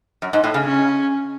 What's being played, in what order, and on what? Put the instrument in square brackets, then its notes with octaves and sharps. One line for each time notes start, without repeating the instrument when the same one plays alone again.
[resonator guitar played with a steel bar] F#2
G#2
A2
C#3
[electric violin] C#4